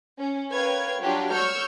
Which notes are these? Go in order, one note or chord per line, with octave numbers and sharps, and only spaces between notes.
C#4
A#4 B4 C#5 F5 G5 G#6
F#3 G3 D4 F4 G4
C#5 C#6 E6 F6 G6